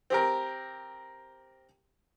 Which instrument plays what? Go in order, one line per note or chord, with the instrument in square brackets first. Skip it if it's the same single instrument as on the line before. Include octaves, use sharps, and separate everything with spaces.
[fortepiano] C4 G4 A#4